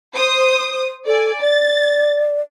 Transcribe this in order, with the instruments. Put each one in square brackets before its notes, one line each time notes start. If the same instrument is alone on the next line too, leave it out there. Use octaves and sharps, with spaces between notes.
[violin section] C5 D#6
[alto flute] A4 [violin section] D5 G#5
[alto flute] D5 [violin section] A6